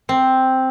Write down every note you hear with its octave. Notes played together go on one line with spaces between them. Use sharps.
C4